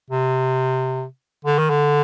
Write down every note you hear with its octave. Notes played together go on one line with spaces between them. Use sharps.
C3
D3
D#3
D3